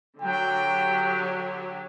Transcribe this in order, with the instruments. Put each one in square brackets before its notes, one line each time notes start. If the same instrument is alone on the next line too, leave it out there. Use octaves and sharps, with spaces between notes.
[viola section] D3 F#3 G4 [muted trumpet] G5